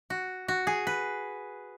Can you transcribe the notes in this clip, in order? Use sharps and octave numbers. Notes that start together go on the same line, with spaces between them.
F#4
F#4
G#4
B4